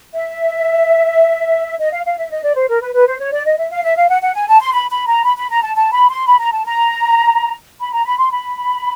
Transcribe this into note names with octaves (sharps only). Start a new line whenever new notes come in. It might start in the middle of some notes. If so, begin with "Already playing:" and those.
E5
D#5
F5
F5
E5
D#5
D5
C5
A#4
B4
B4
C5
C#5
D5
D#5
E5
F5
E5
F5
F#5
F#5
G#5
A5
C6
B5
B5
A#5
B5
B5
A#5
A5
A5
B5
C6
B5
A#5
A5
A#5
B5
A#5
B5
C6
B5